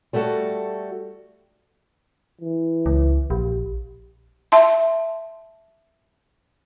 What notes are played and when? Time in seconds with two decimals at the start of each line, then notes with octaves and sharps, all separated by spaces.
0.13 G3 A3 F#4 A4
2.41 E3
2.86 C#2
3.30 A#1 G4
4.52 E5 A5 C6